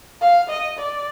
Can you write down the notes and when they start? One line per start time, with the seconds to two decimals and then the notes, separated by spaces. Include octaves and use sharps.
0.21 F5
0.49 D#5
0.78 D5